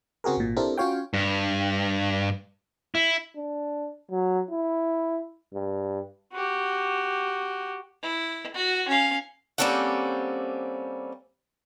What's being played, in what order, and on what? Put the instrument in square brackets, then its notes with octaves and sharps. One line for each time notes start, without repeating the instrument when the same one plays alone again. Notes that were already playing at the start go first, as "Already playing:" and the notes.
[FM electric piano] C#3 C4 F#4 G#4 A#4
G#1 A#2
C4 D4 E4 G4 A4 A#4
C#4 F4 F#4 C#5 F5 G5
[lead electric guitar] G2
E4
[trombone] D4
F#3
E4
G2
[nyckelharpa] F#4 G4
[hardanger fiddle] E4
F#4
C#4 F5
[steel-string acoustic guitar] G3 A#3 C4 C#4 A4 F#5